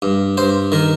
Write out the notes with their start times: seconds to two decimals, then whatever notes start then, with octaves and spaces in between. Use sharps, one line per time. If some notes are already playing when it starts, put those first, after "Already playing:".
0.02 G2
0.37 G2 C5
0.72 D#3 A#4